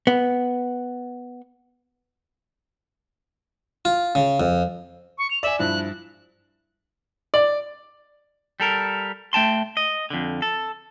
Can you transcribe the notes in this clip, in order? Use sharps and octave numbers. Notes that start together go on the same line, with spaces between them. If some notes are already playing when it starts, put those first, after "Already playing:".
B3
F4
C#3
F2
C#6
F7
D5 E5 G#5
G2 F3 E4 F#6
D5
G3 A4 A#4
A3 G5 A5 C6
D#5
F2 D3
A4